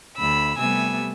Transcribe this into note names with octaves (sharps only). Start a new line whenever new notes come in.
D2 B5 E6
C3 G3 A3 B3 G#5 E6